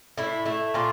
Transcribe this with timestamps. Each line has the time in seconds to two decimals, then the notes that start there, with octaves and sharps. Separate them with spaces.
0.18 A2 E4
0.45 A3 E4
0.74 A#2 F4